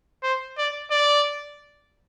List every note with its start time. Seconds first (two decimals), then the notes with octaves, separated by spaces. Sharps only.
0.23 C5
0.58 D5
0.91 D5